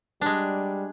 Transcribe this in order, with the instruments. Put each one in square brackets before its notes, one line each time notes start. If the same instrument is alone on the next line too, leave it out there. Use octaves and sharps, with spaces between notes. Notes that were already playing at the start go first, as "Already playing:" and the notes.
[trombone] G3 [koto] G#3 D4